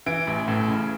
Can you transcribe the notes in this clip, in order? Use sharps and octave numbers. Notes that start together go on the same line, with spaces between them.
E3 D7
A1
A2
C#3